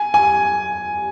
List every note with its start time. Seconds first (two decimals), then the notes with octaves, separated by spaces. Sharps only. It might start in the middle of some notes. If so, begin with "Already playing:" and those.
Already playing: G#5
0.14 G#5